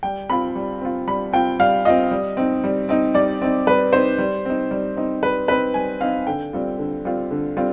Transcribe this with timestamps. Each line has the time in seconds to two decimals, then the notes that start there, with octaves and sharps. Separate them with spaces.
0.03 G3 G5
0.29 C4 F4 B5
0.56 G3
0.81 C4 F4
1.07 G3 B5
1.33 C4 F4 G5
1.59 G3 F5
1.85 C4 F4 D#5
2.11 G3
2.37 C4 D#4
2.64 G3
2.89 C4 D#4
3.14 G3 D5
3.42 C4 D#4
3.67 G3 B4
3.92 C4 D#4 C5
4.18 G3
4.45 C4 D#4
4.71 G3
4.97 C4 D#4
5.23 G3 B4
5.48 C4 D#4 B4
5.74 G3 G#5
6.00 C4 D#4 F5
6.27 D3 G5
6.53 G3 C4 F4
6.78 D3
7.05 G3 C4 F4
7.31 D3
7.57 G3 C4 F4